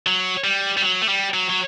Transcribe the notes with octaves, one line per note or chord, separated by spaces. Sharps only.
F#3
G3
G3
F#3
A3
G3
F#3
F#3